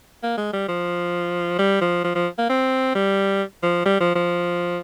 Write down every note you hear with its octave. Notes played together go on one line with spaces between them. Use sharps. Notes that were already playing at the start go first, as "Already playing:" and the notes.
A#3
G#3
G3
F3
G3
F3
F3
F3
A#3
C4
G3
F3
G3
F3
F3